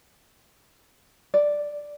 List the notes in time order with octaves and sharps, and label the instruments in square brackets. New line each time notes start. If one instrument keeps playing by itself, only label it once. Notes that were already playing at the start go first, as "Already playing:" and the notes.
[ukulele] D5